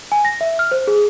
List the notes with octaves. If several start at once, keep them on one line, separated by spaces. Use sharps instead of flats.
G#5
A#6
E5
F6
C5
G#4